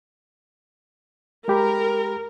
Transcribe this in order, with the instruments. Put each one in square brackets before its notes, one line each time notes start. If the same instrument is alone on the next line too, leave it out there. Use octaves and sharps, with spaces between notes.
[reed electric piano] G#3 G4 B5 [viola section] A#4